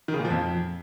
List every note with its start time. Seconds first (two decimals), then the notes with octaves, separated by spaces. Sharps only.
0.08 D#3
0.14 C#3
0.19 A#2
0.25 F3
0.30 F2